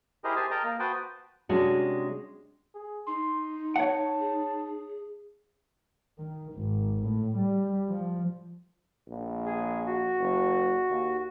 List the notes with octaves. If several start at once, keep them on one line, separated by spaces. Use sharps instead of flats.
E4 G4 G#4 A#4 C5 D#5
G4 G#4 C5 G#5 A5
A#4 D#5 G5 A5 A#5
A#3
F#4 B4 C5 G5 A5 D#6
C3 G#3 C#4 D4 F#4
G#4
D#4 C6
C#5 F#5 A5
G#4
D#3
G#1
A2
G3
F3
A#1
G#4
F#4
F#1
D#2